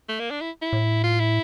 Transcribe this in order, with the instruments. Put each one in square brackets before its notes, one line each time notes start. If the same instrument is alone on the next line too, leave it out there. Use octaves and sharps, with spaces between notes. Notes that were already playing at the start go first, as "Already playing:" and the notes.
[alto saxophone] A3
A#3
D4
E4
E4
[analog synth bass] A2
[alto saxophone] F4
E4